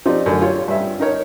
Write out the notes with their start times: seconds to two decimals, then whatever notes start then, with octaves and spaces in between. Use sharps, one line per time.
0.06 F3 C4 D#4 F4 G4 D5
0.26 A1 F#2 D3
0.41 F4 G4 C#5
0.68 G2 E5
1.00 D#4 A#4 C#5